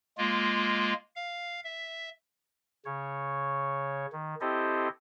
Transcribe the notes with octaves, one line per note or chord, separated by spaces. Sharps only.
G#3 A#3 F4
F5
E5
C#3 C#5
D#3
C4 E4 G4 A4 C5 D#5